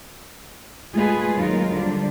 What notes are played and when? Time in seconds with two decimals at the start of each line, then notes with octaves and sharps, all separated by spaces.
0.94 G#3 A3 F4 G#4 B4
1.36 D#2 F#3 G#3 D#4 F4 A#4
1.73 D3 F3 G3 D4